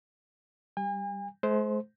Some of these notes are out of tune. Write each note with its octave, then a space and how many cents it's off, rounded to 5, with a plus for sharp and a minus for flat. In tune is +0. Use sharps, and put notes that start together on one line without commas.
G3 +0 G#5 -40
G#3 +45 C5 +0